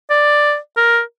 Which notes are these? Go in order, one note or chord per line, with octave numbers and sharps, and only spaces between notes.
D5
A#4